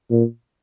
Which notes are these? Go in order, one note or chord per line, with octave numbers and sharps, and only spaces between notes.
A#2